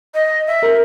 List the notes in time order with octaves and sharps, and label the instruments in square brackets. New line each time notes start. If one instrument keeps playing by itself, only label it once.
[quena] D#5
E5
[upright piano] A#4